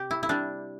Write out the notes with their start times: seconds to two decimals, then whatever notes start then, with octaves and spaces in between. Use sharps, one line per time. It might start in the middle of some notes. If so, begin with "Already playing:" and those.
Already playing: C3 G4
0.11 E4
0.23 E4
0.29 C3 G3 D4